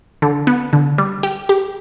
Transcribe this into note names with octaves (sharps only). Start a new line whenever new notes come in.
D3
B3
D3
G3
G4
G4